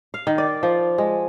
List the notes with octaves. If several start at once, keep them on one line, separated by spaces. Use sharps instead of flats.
F5
D#3
D5
F3
G#3